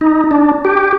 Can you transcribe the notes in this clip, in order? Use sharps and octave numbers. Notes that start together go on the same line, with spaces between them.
D#4
D4
G4